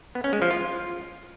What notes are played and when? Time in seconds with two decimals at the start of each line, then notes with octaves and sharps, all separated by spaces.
0.15 B3
0.24 C#4
0.33 G#3
0.42 F3
0.50 F4